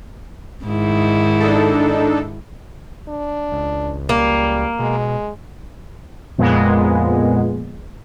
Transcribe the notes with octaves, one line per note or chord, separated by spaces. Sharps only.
G#2 D#3 E4
D4 D#4 A4
D4
C#2
G3 A#3
B2 G#3
F2 A#2 G#3 B3